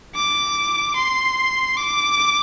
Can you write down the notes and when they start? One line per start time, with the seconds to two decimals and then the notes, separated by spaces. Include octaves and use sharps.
0.15 D6
0.96 C6
1.77 D6